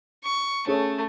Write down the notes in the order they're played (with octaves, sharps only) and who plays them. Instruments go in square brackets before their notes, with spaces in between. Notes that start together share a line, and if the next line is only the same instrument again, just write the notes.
[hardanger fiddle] C#6
[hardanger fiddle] A3 [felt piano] C#4 G#4 C#5